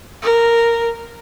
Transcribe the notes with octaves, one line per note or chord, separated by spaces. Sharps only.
A#4